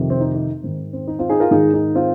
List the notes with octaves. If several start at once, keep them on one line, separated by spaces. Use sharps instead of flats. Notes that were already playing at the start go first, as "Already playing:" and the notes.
Already playing: F2 C3 D#3
C4
D#4
D#4
G#2 D#3 C4
C4
D#4
C4 F4
D#4 G#4
F4 A#4
G#2 D#3 D#4 G#4
D#4
C4 F4